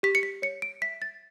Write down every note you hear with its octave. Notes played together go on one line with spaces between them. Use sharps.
G4 B6
C#7
B6
C#5 C#7
D7
E5 B6
A6